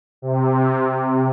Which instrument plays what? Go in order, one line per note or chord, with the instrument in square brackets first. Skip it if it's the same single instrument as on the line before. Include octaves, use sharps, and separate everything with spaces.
[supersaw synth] C3